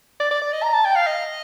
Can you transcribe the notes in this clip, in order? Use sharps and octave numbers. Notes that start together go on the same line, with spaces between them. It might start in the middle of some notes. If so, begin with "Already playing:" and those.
D5
D5
D5
D#5
A#5
A5
G5
F5
D#5